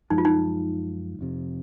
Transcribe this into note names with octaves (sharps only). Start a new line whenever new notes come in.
F#2 F3 G#3 D#4
F4
D#4
F1 F2 C3